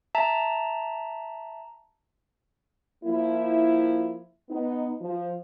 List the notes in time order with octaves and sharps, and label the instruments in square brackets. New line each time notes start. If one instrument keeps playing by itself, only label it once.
[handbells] E5 A5 A#5
[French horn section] F3 A#3 E4
B3 D#4
F3